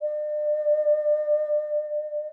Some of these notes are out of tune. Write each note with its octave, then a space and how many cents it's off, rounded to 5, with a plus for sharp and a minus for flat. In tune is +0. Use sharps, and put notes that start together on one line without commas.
D5 +40